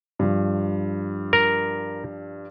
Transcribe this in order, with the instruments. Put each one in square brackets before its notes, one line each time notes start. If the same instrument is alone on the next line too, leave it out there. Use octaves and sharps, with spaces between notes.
[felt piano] G2 F3
[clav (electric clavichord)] A#4